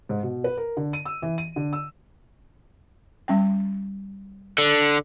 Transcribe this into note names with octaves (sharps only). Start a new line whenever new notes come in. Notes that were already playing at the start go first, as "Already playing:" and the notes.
G#2
B2
B4
A#4
D3
D#7
E6
E3
D#7
D3
E6
G3 C#4 G5
D3